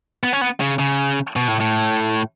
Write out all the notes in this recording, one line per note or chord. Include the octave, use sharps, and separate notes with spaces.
B3
C#4
B3
C#3
C#3
B2
A2
A2